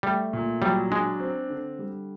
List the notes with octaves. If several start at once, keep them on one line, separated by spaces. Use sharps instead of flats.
G3 A3
A#2
F#3 G3
G#3 D4
C4
D3
G3